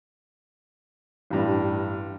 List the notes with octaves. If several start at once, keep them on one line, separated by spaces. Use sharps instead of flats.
A1 G2